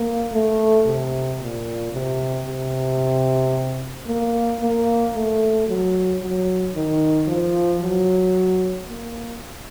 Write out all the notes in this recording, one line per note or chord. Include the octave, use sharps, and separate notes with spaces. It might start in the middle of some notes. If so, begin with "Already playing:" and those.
Already playing: A#3
A3
C3
A#2
C3
C3
A#3
A#3
A3
F#3
F#3
D#3
F3
F#3
A#3